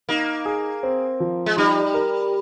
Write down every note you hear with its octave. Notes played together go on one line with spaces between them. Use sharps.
A#3 D#4
G#4
C4
F3
G#3
G3 D#4
A#4